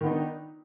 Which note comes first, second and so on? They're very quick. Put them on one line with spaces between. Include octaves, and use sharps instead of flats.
D#3 B3 D#4 D4